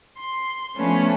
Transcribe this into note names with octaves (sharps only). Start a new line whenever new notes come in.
C6
F3 A3 B3 C#4 D4 B4